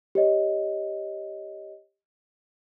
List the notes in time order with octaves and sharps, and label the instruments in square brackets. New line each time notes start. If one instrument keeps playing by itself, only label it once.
[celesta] G4 C#5 D#5